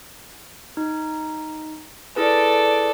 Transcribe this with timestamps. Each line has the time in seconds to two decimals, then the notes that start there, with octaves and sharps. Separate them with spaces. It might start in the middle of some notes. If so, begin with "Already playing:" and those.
0.77 D#4
2.16 E4 G#4 A4 B4 D5